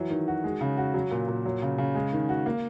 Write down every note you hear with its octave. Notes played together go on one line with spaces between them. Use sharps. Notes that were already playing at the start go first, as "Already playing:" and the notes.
Already playing: E3 F#3
D#3
F#4
G#3
C#3
F#4
F#3
A#2
A#2
F#3
C#3
C#3
G#3
D#3
F#4
A#3